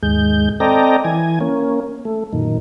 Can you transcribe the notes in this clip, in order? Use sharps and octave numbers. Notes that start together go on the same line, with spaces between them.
D#2 G#2 G#3 G6
C4 A4 D5 D#5 G5 A#5
E3 G#5
A#3 C#4
A3
F#2 A#2 D#3